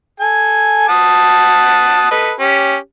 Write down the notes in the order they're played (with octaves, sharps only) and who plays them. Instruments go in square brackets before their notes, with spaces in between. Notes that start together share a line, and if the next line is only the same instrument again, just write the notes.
[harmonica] A4 G#5
F#5 A5 D#6
A4 B4 D#5
C#4 G4